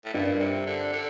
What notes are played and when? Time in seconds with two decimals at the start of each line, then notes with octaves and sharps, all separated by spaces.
0.05 A2
0.14 G2 A#2
0.40 C3
0.66 D3
0.93 D3